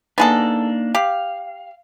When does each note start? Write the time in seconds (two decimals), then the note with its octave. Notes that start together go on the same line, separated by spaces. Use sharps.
0.18 A#3 B3 D4 D#4 G#4 A4
0.95 G4 F5